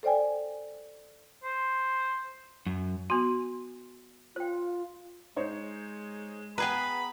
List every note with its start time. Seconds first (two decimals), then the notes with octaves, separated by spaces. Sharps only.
0.03 A4 C5 D5 G5 G#5
1.44 C5
2.66 F#2
3.10 B3 F#4 C6
4.36 F4 C5 G5
5.36 G#3 D#4 C5 C#5
6.58 B3 G#4 B4 G5 A#5 B5